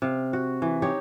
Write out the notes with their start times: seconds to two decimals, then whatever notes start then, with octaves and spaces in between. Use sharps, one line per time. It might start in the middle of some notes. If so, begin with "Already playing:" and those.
0.02 C3 F5
0.33 F#4
0.62 E3
0.82 D#4 G4 C#5